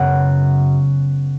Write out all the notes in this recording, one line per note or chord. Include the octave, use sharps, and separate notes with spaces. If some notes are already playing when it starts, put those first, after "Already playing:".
Already playing: F#2 C#3 G#3 B3 F#5